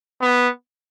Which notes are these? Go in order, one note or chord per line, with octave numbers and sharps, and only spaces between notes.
B3